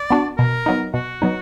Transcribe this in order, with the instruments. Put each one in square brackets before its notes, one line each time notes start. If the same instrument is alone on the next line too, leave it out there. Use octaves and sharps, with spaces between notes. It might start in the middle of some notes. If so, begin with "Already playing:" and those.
Already playing: [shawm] D5
[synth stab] B3 D4 F#4
[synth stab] B2 [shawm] A#4
[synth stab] F#3 B3 D#4
[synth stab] B2 [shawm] F#4
[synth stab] F#3 B3 D#4